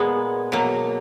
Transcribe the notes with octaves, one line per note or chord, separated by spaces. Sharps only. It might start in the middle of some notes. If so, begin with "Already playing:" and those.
Already playing: A#2 G#3 B3
B2 F#3 A#3